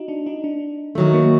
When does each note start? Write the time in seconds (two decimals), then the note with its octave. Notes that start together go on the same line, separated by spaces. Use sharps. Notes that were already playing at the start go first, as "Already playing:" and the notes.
Already playing: D#4 F#4
0.08 D4
0.26 D#4
0.44 D4
0.95 D#3 F#3 A3
1.13 A#3